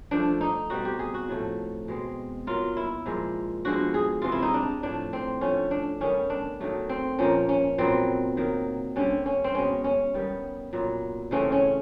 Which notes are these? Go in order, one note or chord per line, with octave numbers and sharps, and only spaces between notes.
D3 F3 A3 D4
D#4
B2 G3 C4 F#4
G4
G#4
F#4
A2 F3 A3
B2 G#3 C4
B2 F#3 A#3 F4
E4
A#2 F3 G#3
D3 F3 G#3 B3 F#4
G#4
C3 E3 G#3 C4 F4
E4
D#4
D4
A2 F3 A3 D4
C4
D3 F3 A3 C#4
D4
D#3 G3 B3 C#4
D4
D#3 F#3 A3
C4
A#2 F3 A#3 C#4
C#4
A#2 F#3 B3 C4
D#3 F#3 A#3
D3 G3 C4 C#4
C#4
C4
B2 G#3 B3 C#4
C#4
D#3 G3 B3
A#2 F#3 B3
C#3 E3 A3 C4 C#4
C#4